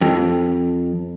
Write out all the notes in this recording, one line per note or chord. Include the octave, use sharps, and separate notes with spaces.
F2